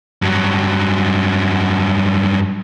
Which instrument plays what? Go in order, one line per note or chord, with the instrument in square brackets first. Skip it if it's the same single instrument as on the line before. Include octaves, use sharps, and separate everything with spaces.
[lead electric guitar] G2 F#3